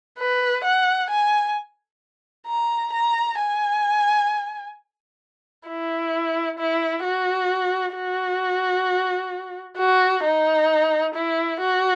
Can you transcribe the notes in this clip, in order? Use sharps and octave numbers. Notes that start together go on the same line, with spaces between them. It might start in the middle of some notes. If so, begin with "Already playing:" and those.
B4
F#5
G#5
A#5
A#5
G#5
E4
E4
F#4
F#4
F#4
D#4
E4
F#4